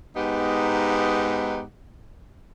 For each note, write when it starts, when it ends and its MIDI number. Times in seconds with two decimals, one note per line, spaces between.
0.16 1.62 44
0.16 1.62 59
0.16 1.62 63
0.16 1.62 67
0.16 1.62 78